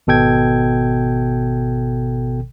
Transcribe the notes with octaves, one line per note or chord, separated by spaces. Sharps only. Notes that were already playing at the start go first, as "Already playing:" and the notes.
G#1 B2 A4 G5 G#6